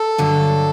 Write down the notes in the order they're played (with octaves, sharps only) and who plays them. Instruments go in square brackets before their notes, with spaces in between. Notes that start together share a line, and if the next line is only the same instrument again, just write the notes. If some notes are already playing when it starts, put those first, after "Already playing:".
Already playing: [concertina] A4
[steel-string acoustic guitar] G2 D3 F#3